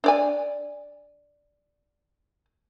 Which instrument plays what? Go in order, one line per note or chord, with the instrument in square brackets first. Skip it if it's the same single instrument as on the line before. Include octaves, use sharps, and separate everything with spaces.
[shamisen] D4 D5 G#5